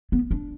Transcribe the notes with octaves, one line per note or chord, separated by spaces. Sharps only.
B3
D4